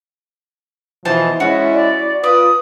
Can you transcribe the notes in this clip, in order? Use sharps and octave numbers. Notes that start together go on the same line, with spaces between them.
B2 E3 F3 C5 A5
G#3 C#4 E4 F#4
D5
F4 B4 D5 D#6